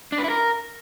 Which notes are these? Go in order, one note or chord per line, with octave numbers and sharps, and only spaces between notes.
D4
B4
E4
A#4